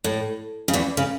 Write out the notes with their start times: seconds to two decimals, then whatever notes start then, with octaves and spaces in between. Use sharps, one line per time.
0.04 A2
0.68 C#3
0.73 E2 E3
0.97 C#3